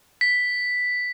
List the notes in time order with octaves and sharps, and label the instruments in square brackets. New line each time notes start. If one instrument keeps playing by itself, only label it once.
[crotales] B6